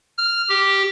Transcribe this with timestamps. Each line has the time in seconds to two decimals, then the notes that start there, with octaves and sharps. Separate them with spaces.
0.18 F6
0.49 G4